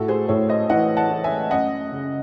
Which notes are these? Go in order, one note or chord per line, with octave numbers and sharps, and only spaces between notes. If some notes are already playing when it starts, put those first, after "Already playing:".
Already playing: A2 F#4 A4
G#4 C5
A2 A4 C#5
C5 D#5
E3 D#5 F#5
F#5 A5
E3
E5 G#5
F#2 D#5 F#5
C#3